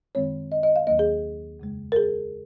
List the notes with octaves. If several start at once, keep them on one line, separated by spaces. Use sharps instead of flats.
F#2 D#3 G#3 C4 C#5
D#5
D#5
F5
D#2 D#3 F#3 A#3 D#5
G#4
F2 C#3 G#3
A#4
G#4